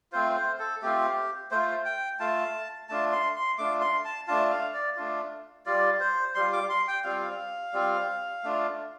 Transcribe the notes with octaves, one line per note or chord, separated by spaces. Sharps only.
A3 C4 F4 C5
C5
A4
A3 C4 F4 G4
A3 F4 C5
G5
A3 F4 A5
A3 D4 F4 A5
C6
C6
A3 D4 F4 D6
C6
A5
A3 D4 F4 A5
F5
D5
A3 D4 F4
G3 F4 D5
C5
G3 F4 C6
D6
C6
G5
G3 C4 F4 F5
G3 C4 F4
A3 D4 F4